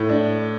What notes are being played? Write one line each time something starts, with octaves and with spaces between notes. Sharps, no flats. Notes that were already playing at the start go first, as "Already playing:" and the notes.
Already playing: A2
D4